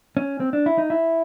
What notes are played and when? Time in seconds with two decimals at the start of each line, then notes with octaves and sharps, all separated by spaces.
0.17 C#4
0.40 C4
0.53 D4
0.66 E4
0.78 D#4
0.90 E4